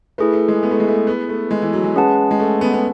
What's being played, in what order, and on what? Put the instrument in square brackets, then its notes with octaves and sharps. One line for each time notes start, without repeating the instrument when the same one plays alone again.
[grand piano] A3 [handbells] E4 G#4 B4
[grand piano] A3
G#3
B3
A3
G#3
A3
B3
A3
G#3
E3
F#3
G#3
[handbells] C#4 G#4 B4 F#5 A5
[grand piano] G#3
A3
B3
B3